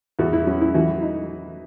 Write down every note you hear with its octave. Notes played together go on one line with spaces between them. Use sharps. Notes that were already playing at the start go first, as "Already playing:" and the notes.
E2 F#4
E4
F#3 C#4
E4
E3 F#4
D#4